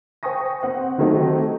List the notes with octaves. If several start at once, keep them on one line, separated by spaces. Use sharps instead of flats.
C5 G5 G#5 C#6 D#6 A#6
C4 F#5
D#3 F#3 A3 C4 D#4 G4